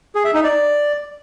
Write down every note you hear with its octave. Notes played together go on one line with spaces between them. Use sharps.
G#4
E5
D#4
D5